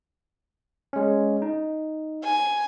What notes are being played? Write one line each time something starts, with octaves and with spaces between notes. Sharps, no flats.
G#3 C#4
D#4
G#5